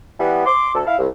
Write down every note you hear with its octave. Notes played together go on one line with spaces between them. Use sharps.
E3 G3 B3
C6 D6
D2 A4
E4 F5
C2